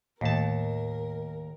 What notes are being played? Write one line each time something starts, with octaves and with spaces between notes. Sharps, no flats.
D#2 A2 A#4 A5